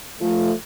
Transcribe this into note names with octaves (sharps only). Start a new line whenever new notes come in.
F3 A3